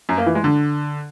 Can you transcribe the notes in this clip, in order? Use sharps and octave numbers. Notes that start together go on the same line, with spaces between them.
F#2
A#3
E3
G#3
D3